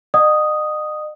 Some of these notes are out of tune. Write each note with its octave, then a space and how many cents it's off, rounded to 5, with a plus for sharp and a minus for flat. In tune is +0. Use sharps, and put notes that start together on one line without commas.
D#5 -40 F#5 +0 D#6 +0